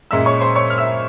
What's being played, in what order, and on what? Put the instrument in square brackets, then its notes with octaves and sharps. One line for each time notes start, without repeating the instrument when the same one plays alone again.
[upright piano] A#2 G#3 C#4 E5 E6
C#5 C#6
C5 C6
C#5 C#6
F6
E5 E6